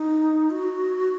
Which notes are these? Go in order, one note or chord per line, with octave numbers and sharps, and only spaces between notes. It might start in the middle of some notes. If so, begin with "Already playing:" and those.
Already playing: D#4
F#4